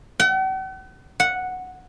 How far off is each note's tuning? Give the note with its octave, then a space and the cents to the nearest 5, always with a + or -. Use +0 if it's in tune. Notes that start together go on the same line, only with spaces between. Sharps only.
F#5 +45
F#5 -5